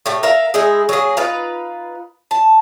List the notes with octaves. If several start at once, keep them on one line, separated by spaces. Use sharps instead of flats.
A2 G4
A#4 E5 F5
G#3 D#4 E4 G#4
F#3 A#3 G#4
D#4 F4 B4 F5
A5